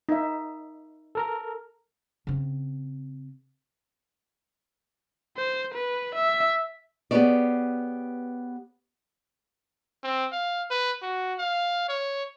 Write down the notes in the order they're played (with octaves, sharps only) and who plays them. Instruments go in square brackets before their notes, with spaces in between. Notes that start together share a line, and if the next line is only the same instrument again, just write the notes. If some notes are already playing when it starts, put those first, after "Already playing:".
[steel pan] D#4 E5
[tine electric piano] A4 A#4 A#5
[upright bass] C#3 C4
[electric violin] C5
B4
E5
[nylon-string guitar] B3 G4 G#4 B4 C#5 D5
[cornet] C4
F5
B4
F#4
F5
C#5